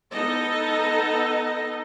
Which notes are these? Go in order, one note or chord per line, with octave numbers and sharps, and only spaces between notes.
B3 D#4 A4 D#5